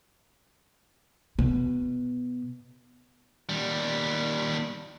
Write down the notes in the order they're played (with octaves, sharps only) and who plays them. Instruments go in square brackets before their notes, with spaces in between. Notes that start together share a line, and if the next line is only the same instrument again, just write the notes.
[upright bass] B2
[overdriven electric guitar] D#2 G3